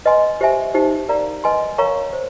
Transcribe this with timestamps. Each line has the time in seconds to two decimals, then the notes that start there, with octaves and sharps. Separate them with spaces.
0.05 B4 D#5 G#5 C6
0.41 G4 C5 E5 G#5
0.74 D#4 G4 C5
1.09 A#4 D5 F5 A#5
1.44 B4 D#5 G#5 C6
1.78 A#4 C#5 F5 A#5 C#6
2.13 C5